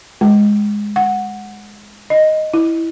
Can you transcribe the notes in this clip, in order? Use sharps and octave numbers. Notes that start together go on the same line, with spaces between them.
G#3
F#5
D#5
E4